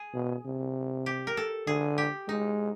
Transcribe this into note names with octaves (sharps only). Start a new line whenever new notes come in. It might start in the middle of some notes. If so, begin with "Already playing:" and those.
Already playing: G#4
B2
C3
G4
A#4
A4
D3 G#4
G4
G#3 D#4